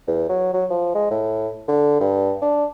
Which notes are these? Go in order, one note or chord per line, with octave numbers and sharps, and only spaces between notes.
E2
F#3
F#3
F3
G#3
A2
D3
G2
D4